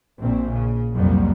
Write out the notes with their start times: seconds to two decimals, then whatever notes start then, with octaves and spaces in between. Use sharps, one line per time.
0.19 A#1 C4
0.53 C#3
0.94 C2 F2 F#3 G3 A#3